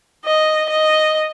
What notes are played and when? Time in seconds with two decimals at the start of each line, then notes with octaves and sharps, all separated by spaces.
0.25 D#5
0.70 D#5